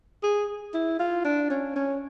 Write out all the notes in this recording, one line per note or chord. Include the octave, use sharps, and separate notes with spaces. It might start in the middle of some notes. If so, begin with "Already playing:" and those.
G#4
E4
F4
D4
C#4
C#4